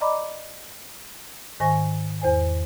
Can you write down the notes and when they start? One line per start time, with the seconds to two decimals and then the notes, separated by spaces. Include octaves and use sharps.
0.01 D5 D#5 A#5 B5 D6
1.60 G#2 D#3 C5 G#5 C#6 A#6
2.21 E2 C5 G#5